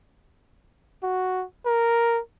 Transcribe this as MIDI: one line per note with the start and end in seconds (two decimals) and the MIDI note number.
1.03 1.45 66
1.66 2.20 70